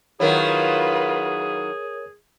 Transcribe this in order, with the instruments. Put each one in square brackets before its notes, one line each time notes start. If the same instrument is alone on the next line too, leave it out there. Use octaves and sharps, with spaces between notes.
[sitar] D#3 F#3 E4 [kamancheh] F4 B4 [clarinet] G#4 [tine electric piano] A#4 C#5